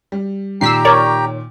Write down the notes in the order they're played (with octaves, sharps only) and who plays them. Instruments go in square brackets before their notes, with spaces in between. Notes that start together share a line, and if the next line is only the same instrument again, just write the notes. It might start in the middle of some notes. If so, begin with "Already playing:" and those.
[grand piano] G3
[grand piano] A#2 D#3 [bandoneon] G4 G5 A#5 [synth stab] E6 B6 C7
[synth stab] A#4 C#5 D5